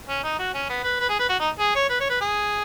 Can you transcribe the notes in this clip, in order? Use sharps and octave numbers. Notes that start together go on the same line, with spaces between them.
C#4
D#4
F#4
C#4
B3
B4
B4
G#4
B4
F#4
D#4
G#4
C#5
B4
C#5
B4
G#4